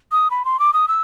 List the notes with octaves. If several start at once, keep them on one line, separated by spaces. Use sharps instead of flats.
D#6
B5
C6
D6
D#6
E6